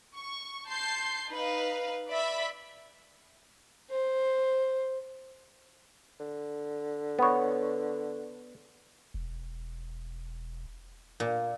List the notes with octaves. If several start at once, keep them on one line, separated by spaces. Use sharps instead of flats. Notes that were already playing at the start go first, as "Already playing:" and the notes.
C#6
A5 C6 G6 C7
D#4 B4 F5
D5 E5 B5
C5
D3
B3 C#5
E1
A#2